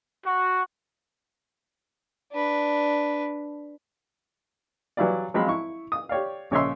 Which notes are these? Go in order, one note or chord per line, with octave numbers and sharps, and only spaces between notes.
F#4
D4 B4
E3 F#3 G3 E4 F4 D5
F3 F#3 G#3 C4 F4 B5
E4 C#6
D#6
G4 C#5 D5 F5
A#1 C#3 C#5 D#5 E5 C6